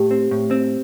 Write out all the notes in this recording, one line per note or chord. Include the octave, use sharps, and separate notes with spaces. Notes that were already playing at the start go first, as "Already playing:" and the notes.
Already playing: A2 G4
C4
A2
C4